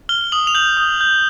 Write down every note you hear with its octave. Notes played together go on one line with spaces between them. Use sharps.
F6 G7
D#6 F#7
F7
G6 F#7
D#6
G6